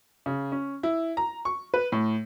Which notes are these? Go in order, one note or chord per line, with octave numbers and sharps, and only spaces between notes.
C#3
C#4
E4
A#5
C#6
B4
A2